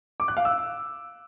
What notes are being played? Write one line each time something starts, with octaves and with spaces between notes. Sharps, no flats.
D6
F#6
F5
E6